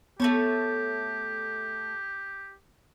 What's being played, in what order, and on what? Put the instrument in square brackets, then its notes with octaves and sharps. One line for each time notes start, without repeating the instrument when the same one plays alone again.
[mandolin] A3 A4 C#5 [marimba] B3 [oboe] G4